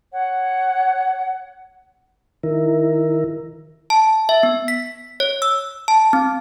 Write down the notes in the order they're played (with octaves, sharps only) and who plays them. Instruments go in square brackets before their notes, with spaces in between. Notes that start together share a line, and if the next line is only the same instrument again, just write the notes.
[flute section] C#5 F#5
[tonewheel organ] D#3 E4 A#4
[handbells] A5
E5
B3
B6
C#5
E6
A5
C4